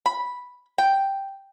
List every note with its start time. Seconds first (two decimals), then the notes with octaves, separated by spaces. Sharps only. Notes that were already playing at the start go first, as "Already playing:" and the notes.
0.06 B5
0.78 G5